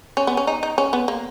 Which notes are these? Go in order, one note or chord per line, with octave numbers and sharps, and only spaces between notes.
C#4
B3
C#4
D#4
D#4
C#4
B3
A#3